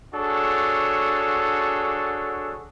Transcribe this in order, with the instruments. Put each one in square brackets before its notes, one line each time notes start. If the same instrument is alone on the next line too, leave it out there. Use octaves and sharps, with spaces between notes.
[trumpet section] D4 F#4 G#4 A4 C#5